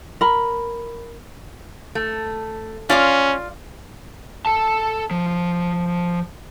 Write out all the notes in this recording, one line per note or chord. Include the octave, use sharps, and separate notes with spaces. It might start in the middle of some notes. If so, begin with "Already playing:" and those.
A#4 B5
A3
C#4 F4 D5 F5 D6
A4 A5
F3